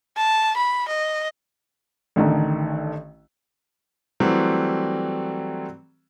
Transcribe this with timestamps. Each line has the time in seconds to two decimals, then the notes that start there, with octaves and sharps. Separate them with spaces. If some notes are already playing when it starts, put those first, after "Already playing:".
0.17 A5
0.57 B5
0.88 D#5
2.16 A1 D3 D#3 A3
4.20 E3 F#3 G3 A3 C4